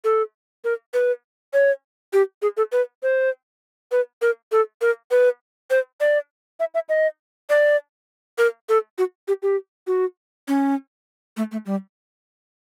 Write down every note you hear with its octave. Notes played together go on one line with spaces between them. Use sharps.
A4
A#4
B4
C#5
G4
G#4
A4
B4
C5
B4
A#4
A4
A#4
B4
C5
D5
E5
E5
D#5
D5
A#4
A4
F#4
G4
G4
F#4
C#4
A3
A3
G3